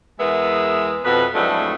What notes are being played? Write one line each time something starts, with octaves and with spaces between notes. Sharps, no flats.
E2 G#3 B3 G#4 A#4 E5
F2 B2 B4
F2 A2 F#3 G#3 A3 D4